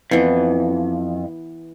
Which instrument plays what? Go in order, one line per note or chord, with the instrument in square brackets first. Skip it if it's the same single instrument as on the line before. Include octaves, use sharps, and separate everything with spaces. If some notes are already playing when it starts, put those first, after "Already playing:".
[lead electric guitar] F2 [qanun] E3 B3